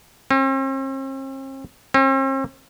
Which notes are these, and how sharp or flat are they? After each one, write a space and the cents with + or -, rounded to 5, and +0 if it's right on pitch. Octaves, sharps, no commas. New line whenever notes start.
C4 +45
C4 +45